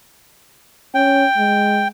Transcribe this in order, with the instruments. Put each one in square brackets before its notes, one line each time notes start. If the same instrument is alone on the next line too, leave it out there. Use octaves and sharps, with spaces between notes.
[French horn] C#4 [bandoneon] G5
[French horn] G#3